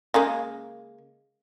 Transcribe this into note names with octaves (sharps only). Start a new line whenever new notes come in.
C#3 G#3 A#3